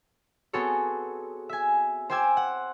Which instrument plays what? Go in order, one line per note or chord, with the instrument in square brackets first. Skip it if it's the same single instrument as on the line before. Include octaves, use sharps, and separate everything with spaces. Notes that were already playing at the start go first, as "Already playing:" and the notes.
[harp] B3 C4 F#4 G#4 A4 C#5
E5 G#5
C5 G5 G#5 D6 E6 G#6
F#5